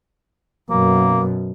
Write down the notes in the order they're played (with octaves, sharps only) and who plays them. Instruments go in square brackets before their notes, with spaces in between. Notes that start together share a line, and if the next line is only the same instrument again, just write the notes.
[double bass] F#2 B2 [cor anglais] A#3